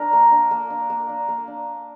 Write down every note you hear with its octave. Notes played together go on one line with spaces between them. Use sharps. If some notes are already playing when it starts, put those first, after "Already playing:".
Already playing: D4 A#4
A#3
D4
A#3
D4
A#3
D4
A#3
D4